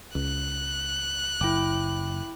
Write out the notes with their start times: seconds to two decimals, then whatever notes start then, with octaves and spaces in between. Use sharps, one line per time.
0.15 C#2 F#6
1.41 F#1 E4 G5 D6